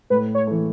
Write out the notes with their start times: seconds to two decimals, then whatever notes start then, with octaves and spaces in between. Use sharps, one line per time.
0.10 A2 B4
0.35 C#5
0.47 E3 A3